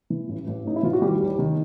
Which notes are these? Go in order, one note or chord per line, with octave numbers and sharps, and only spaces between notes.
E3
A1
A1
A2 D#4
E4
E3 F4
F#4
D#3 G3 G4
D#2
D#3